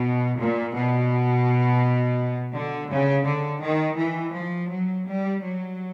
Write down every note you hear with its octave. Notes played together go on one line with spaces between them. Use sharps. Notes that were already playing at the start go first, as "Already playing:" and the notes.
Already playing: B2
A#2
B2
D3
C#3
D3
D#3
E3
F3
F#3
G3
F#3